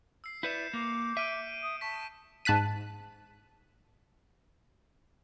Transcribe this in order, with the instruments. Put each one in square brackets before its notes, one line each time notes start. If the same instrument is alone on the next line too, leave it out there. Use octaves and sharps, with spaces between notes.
[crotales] E6 C7
[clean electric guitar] E4 B4 E5 [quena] D5 [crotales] G6 C#7 E7
[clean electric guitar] A#3 [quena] D6
[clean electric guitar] E5 [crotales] F6 D7 D#7
[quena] D#6
[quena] A5 [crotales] C#6 B6
[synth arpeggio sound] G#2 A5 F#6 B6 D#7